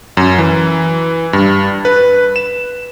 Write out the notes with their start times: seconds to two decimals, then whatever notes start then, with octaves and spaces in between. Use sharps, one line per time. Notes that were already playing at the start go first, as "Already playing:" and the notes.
0.17 F#2
0.38 E3
1.33 G2
1.85 B4
2.36 E7